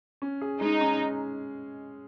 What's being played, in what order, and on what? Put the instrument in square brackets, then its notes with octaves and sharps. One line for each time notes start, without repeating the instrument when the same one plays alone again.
[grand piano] C#4
G#4
[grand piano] G#3 [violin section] D#4
[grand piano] C#4